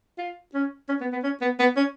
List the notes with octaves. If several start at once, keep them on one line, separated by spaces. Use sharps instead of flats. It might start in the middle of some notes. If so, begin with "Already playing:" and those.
F4
C#4
C#4
B3
B3
C#4
B3
B3
C#4